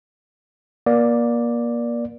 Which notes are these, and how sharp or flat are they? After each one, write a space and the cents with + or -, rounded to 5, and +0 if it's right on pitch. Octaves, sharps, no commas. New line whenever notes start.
A#3 +30 D5 +0